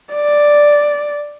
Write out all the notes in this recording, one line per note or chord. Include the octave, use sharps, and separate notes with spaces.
D5